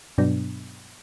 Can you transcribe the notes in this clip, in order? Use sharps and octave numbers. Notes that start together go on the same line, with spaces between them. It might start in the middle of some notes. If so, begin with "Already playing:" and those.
G2 B2 F#3 B3 D4